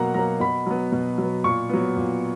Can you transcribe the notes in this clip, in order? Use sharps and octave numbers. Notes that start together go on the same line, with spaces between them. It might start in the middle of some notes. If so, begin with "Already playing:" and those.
Already playing: B2 F#3 A#3 F#5 A#5
F#3 A#3 A#5
B2 B5
F#3 B3
B2
F#3 B3
A#2 C#6
F#3 B3
A#2